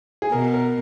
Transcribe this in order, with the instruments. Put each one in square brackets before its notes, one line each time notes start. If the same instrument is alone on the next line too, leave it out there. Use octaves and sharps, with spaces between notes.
[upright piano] G#4
[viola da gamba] B2 [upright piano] A#4
[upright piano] A#4